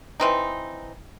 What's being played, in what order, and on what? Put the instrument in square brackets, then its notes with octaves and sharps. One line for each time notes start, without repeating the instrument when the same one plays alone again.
[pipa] E3 C4 D#4